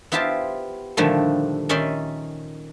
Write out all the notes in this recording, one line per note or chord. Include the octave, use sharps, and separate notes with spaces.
B3 E4 F4 G4 C5 A5
A#2 D3 D#3 F3 G3 A3
D#3 C#4 D#4 D5 E5 C6